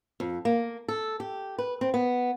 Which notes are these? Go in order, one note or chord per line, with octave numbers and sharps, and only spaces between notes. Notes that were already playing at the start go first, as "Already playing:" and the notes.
F2
A#3
A4
G4
B4
C4
B3